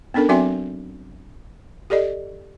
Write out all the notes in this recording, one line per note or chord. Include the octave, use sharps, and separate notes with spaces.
B3 C#4 D4 A4 A#4
F#3 C4 F#4 E5 G5 C6
G4 A4 D5 D#5